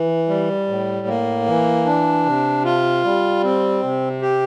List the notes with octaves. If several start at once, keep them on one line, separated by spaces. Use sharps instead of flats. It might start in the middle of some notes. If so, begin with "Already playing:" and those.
Already playing: E3
G3
A2
A#3
E3
D4
C3
F4
G3
C4
C3
G4